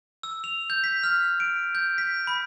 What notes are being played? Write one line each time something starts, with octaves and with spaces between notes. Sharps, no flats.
E6
F7
G6
B6
F6
D7
G6
B6
B5